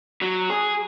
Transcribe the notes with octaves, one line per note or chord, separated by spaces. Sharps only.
F#3
G#4